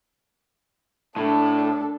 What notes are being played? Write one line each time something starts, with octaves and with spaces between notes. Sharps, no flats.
A2 D4 A4